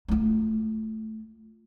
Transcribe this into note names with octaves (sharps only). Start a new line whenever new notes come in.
A3 F4